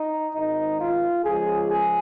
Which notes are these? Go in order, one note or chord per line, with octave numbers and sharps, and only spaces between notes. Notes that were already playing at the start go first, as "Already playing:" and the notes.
Already playing: D#4
G#1 G#2 D#3 D#4
F4
C#2 C#3 F3 G#3 G#4
G#4